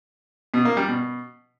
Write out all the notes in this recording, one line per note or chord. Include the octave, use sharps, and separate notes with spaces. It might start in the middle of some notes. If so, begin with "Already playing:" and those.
B2
A#3
G3
B2